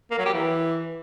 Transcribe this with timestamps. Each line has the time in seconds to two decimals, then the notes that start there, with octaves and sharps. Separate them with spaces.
0.11 A#3
0.18 F#3
0.26 G4
0.33 E3